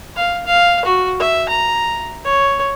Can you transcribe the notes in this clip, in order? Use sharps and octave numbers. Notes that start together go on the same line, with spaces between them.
F5
F5
F#4
E5
A#5
C#5